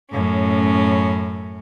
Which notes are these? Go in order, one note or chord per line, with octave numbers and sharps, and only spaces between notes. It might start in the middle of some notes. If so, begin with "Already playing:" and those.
F#2 A2 C#4